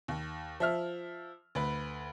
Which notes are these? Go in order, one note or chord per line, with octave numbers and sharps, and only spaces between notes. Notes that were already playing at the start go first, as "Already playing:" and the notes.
D#2
F3 E5 F6
D2 B4